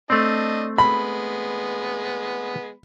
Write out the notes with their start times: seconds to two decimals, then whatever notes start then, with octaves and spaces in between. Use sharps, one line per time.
0.10 A3 C4 D4 D#5
0.78 G#3 B3 B5